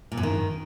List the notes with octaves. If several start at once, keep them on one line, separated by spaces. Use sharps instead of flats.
A#2
F#2
D#3